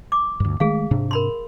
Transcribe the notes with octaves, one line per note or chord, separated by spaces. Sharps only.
D6
D2 G2
D#3 G#3 A3 G#4 F5
G#2 C3 D4
A#4 B5 C6